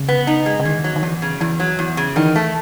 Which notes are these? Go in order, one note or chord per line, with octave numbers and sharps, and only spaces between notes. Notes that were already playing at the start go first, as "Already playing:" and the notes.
Already playing: C#3
B3
D#4
G#3
C#3
E2 D#3
F#3
D#3
E2 E3
C#3
E2 E3
F#3
E2
C#3
D#3 E3
A3